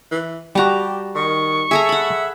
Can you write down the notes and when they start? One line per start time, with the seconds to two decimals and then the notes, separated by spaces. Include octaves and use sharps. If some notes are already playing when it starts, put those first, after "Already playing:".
0.11 E3
0.55 G3 F#4 G4 A5 A#5
1.15 D#3 C#6
1.71 G#4 A4 E5 A#5
1.89 F#5 B5